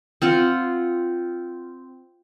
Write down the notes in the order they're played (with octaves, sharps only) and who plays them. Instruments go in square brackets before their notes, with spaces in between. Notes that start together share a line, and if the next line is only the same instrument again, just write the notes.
[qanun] C4 F4 F#5